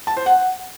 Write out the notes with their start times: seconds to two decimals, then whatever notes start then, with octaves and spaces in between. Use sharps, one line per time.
0.07 A5
0.17 C5
0.26 F#5